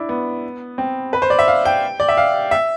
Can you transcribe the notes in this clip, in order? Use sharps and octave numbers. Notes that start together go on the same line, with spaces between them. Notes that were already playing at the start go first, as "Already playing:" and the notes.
Already playing: D4 E4
B3
C4
B4
C5
D5
E5
F5
G5
D5
E5
F5
E5